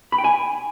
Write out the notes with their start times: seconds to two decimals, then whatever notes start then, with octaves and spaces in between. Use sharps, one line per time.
0.12 B5
0.18 G5
0.24 G#5